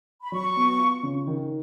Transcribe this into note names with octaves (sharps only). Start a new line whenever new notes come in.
B5
F#3 C#6
B3
F4
C#3
D#3